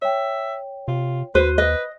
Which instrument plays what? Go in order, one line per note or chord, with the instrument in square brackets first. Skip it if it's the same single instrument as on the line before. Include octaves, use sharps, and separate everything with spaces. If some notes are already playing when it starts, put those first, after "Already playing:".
[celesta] C#5 G5 [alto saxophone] E5
[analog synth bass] C3 [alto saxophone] F4
[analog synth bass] D#2 [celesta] F#4 F#6 D#7 [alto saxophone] B4 [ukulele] C5
[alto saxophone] B4 [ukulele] D#5 [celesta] F#6